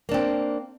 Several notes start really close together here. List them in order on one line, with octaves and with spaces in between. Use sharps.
A#3 D4 C4